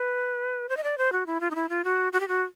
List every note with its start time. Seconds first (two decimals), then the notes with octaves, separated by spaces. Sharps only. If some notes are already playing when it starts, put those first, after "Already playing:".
Already playing: B4
0.69 C5
0.77 D#5
0.84 D5
0.98 C5
1.12 F#4
1.26 E4
1.41 F4
1.51 D#4
1.55 E4
1.69 F4
1.84 F#4
2.13 F#4
2.20 G4
2.28 F#4